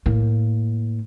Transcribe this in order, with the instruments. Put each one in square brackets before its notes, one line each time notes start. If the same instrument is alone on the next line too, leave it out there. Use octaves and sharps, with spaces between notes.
[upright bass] A2 A#3